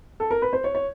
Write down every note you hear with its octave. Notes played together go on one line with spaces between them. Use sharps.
A4
A#4
B4
C5
C#5
C#5